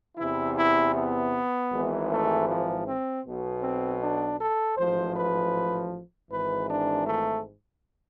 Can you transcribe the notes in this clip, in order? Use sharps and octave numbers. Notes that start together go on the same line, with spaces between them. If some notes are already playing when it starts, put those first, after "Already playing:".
E2 C3 E3 E4
E4
B3
G#1 G#2 E3
A3
F3
C4
B1 B2
C4
D4
A4
A1 G#2 F3 C5
B4
G#1 G#2 E3 B4
D4
A3